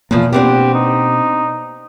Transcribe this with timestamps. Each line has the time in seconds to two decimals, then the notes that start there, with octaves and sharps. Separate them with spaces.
0.11 E2 B2 F3 A#3
0.33 B3 C4 D4 G4
0.74 D#4